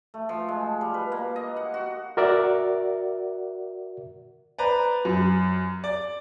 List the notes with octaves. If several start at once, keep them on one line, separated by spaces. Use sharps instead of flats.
A3
F3
G#3
G3
B4
A#3
D#5
F#5
F#4
F#4 A#4 D5 E5 F#5
B4 C5 D5 A#5
F#2
D5